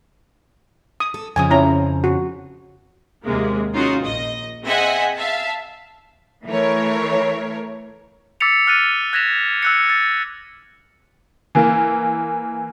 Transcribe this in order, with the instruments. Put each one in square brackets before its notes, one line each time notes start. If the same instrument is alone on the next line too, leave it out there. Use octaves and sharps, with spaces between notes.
[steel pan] D#6
[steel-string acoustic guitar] A4
[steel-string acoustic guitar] F2 C#3 F3 [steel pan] G#5 D#6
[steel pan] C#4 E4 A#5
F#4
[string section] D#2 C3 G#3 A#3
C#4 D#4 F4 F#4
A#1 D#5
C4 G#4 D#5 E5 F#5 G#5
E5 F5 A5
E3 A3 A#4 C#5
[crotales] D6 E6 A6 B6 C#7 F7
D6 F6 F#6 A6 D#7
F#6 G#6 A#6 B6 E7 F7
E6 F#6 C#7
A6
[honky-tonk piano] E3 A#3